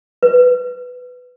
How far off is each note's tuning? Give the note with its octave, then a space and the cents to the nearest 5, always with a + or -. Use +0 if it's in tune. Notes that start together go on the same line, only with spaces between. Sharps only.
B4 +10